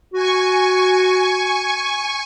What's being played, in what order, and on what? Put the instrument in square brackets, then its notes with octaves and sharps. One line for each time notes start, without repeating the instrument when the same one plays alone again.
[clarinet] F#4 [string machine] G#5 C#6